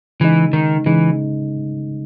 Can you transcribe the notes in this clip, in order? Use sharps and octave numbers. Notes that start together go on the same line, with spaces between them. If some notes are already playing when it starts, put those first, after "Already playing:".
C#3 E3 G#3 D#4
D#3
C#3 E3 G#3 D#4